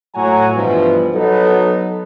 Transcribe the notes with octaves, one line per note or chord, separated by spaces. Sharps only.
A2 F#3 F#4 G#5 A#5
G2 B2 E3 F3 B3
F#3 B3 D#4 A4